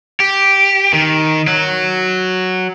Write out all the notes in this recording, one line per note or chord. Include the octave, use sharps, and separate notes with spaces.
G4
D#3
F#3